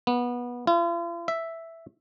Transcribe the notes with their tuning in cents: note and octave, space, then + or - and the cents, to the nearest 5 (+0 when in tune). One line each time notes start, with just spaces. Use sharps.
B3 -20
F4 -45
E5 +0